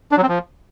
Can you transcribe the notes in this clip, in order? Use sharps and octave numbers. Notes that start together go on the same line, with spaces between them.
D4
F#3
C4
F3